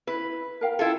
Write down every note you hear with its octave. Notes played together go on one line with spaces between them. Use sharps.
E4 B4
A#4 F5 G5
E4 F4 A4